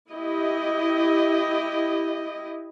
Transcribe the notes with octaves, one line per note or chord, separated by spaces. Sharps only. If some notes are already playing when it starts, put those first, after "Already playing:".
E4 G4 D#5